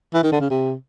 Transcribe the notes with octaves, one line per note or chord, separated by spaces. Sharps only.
E3
D#3
D3
C#3
C3